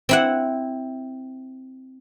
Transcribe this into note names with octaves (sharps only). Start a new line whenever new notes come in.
C4 E4 F#5